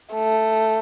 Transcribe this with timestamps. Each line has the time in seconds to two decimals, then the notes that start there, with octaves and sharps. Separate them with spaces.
0.14 A3